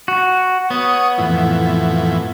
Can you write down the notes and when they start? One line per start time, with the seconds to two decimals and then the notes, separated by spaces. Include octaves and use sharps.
0.08 F#4
0.70 B3 C#5 D#6
1.18 F2 A2 E3